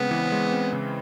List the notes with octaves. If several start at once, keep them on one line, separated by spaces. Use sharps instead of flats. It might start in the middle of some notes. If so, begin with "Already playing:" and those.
Already playing: C#3 G#3 B3 C4
E3
G#3
C4
C#3